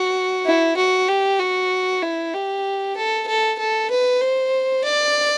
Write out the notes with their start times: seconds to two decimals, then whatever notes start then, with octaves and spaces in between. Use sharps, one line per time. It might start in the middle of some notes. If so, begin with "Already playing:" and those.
Already playing: F#4
0.46 E4
0.77 F#4
1.08 G4
1.40 F#4
2.02 E4
2.34 G4
2.97 A4
3.28 A4
3.59 A4
3.90 B4
4.21 C5
4.84 D5